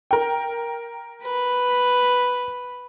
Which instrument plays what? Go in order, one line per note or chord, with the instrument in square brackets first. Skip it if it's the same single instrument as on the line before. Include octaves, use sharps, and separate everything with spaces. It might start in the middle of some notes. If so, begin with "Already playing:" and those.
[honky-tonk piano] A#4 G5
[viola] B4